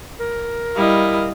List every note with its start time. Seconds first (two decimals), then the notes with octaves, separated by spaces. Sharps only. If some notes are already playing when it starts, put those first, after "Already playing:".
0.19 A#4
0.75 G3 E4 D#5 F5